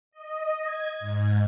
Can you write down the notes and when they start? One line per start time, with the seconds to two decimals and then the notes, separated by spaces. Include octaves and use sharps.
0.11 D#5
0.63 G#6
1.00 G#2